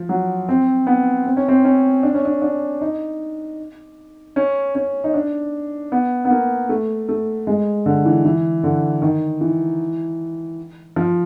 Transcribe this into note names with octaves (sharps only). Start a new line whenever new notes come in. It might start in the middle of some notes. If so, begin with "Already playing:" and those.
Already playing: F3
F#3
C4
B3
C4
C#4
C4
C#4
D4
C#4
D4
D4
D#4
C#4
C#4
D#4
D4
B3
B3
A#3
A3
A3
G#3
D3
E3
E3
D3
D#3
E3
F3